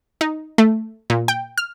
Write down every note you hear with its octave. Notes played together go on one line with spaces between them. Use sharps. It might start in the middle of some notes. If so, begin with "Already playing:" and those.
D#4
A3
A#2
G5
F6